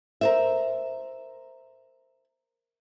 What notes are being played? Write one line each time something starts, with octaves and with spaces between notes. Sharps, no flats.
A#4 C5 E5